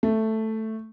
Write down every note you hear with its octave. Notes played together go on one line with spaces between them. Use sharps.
A3